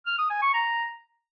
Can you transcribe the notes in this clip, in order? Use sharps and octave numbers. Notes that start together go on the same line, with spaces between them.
F6
D#6
G#5
C#6
A#5